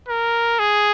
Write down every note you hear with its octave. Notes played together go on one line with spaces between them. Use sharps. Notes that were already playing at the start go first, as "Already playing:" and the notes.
A#4
G#4